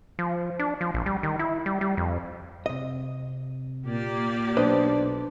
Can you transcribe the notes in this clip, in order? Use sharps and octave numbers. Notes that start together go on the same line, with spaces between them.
F3
D4
F3
A#1
G3
D#3
E4
G3
G3
F2
C3 D#5
A#2 A#3 G4 D5
B1 D4 B4 C5 D#5